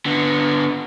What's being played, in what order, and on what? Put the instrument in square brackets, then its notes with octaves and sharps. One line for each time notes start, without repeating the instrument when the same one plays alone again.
[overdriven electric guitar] D3 B3